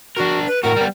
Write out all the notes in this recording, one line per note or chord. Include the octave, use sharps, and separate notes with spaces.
D4 F#4 A#4
B4
A2 F#4 A#4
G3 B3